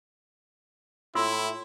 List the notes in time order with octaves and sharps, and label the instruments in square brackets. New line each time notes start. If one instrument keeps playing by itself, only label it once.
[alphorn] A2 [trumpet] E4 [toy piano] F4 C6 E6